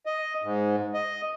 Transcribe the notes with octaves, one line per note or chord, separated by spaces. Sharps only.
D#5
G#2
D#5